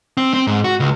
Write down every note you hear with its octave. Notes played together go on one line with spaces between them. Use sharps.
C4
C4
G#2
F#4
C#2